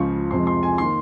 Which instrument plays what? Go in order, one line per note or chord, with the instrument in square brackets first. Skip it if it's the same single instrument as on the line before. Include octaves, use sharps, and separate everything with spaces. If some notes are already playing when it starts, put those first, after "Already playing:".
Already playing: [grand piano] C#2 C#3 F3 C#6
F2 C3 F3 G#3 C6
C6
G#5
D#3 A#3 C6